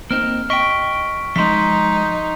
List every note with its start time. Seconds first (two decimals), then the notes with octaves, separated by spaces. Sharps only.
0.11 A#3 C4 D#4 F6
0.50 D#5 G5 C#6 B6 D7
1.36 F3 G#3 D#4 C6 B6